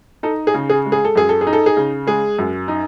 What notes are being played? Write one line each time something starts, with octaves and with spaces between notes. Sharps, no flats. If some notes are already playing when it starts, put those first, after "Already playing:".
D#4 A4
G#4
C#3
G#4
G#3
G#4
A4
F#2 G#4
A4
G#4
D#4
A4
G#4
C#3
G#3 G#4
F#2
D#4